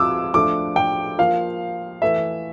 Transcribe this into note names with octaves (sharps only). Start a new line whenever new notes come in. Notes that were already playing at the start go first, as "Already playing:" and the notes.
Already playing: F3 C4 F4 D6 E6
F3 A3 D4 D6
G5
F3 A#3 F4 F5
E3 A3 E4 E5